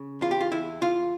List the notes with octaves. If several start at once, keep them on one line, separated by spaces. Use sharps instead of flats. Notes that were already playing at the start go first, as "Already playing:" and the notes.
Already playing: C#3
E2 F4
G4
F4
E2 E4
E2 F4